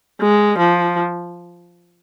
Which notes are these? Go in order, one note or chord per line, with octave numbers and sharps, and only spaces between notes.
G#3
F3